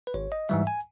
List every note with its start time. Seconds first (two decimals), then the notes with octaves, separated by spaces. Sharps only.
0.07 B4
0.14 G#1 C#5
0.32 D#5
0.49 G#2 E3 G3 E5
0.67 G#5